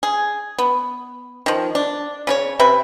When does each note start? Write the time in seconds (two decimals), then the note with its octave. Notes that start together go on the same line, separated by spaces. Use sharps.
0.03 G#4
0.58 B3
1.46 D#3 F3
1.75 D4
2.27 C#3 F4 C#5
2.59 C3 B4 E5